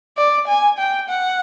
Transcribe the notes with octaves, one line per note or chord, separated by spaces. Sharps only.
D5
G#5
G5
F#5